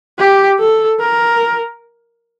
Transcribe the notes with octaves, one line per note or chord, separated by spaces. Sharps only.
G4
A4
A#4